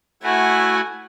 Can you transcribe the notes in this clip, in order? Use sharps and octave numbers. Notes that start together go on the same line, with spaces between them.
A3 E4 F#4 F#5 G#5